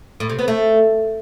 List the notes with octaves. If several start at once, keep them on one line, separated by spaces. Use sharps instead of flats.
A2
C3
B3
A3